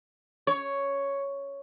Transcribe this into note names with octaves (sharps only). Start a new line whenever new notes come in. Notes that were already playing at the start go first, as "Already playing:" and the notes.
C#5